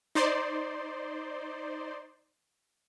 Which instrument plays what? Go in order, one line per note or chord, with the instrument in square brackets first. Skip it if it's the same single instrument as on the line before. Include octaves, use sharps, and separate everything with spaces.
[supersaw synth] D#4 C5 D5 C6